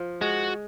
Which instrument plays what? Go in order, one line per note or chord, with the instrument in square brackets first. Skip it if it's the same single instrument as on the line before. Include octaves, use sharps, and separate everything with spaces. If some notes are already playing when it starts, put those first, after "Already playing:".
Already playing: [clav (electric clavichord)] F3
[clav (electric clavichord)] G#3 [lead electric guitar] F#4